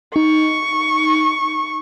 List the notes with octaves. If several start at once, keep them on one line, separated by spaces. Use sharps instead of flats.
D#4 C#6